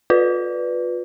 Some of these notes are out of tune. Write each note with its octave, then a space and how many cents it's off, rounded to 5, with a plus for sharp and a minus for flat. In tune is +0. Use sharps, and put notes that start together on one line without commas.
F4 +35 B4 +0 D5 +0